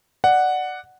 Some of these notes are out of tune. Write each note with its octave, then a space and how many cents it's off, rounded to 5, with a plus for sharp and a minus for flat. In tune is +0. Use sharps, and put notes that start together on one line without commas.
D5 +15 F#5 +0